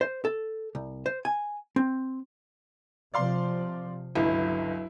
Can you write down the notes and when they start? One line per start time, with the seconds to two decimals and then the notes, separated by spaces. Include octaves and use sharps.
0.01 C5
0.25 A4
0.75 C2
1.06 C5
1.25 G#5
1.76 C4
3.14 C3 F3 D5 F5 C6
4.15 G1 C#2 F#3 E4